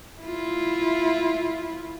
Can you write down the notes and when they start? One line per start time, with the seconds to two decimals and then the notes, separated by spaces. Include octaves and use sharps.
0.21 E4 F4